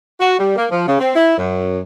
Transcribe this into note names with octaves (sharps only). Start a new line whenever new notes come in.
F#4
G3
A#3
F3
C#3
C4
E4
F#2